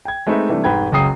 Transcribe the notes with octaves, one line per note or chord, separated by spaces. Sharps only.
G5 G#6
G#3 A3 C4 D#4 B4 E5
C3 E3 G3 A3 D4
F1 G#2 B4 G5 G#6
F#1 C#2 F#3 G5 D#6 C7